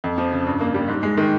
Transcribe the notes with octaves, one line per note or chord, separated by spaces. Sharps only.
F2
F3
C#3
G2
A#3
G3
G#2
G#3
D#3